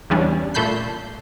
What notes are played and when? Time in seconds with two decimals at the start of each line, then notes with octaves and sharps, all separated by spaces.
0.10 E2 C#3 G3 C#4 D4
0.54 A#2 A3 A5 B5 G6 C7